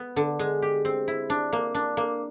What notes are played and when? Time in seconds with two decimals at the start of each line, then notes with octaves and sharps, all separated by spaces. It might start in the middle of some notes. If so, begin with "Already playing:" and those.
Already playing: B3
0.16 D3
0.39 G#3
0.62 G4
0.85 C4
1.08 E4
1.30 D4
1.53 A#3
1.75 D4
1.97 A#3